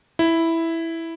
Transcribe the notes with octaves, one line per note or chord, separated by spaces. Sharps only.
E4